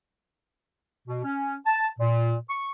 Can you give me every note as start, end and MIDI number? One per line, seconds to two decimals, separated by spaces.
1.08 1.20 47
1.24 1.54 61
1.65 1.86 81
1.99 2.34 46
2.50 2.68 85